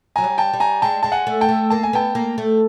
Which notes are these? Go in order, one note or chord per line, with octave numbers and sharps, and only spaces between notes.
F#3 G#5 A#5
G3
G5 A5
G3
G#5 A#5
G#3 G5 A5
G#3 A5
F#5 G#5
A3
G5 A5
A3
A#3 A5
G#5
B3 G5 A5
A#3
A3